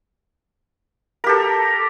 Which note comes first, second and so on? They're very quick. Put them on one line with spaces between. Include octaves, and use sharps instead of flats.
A#4 G4 A4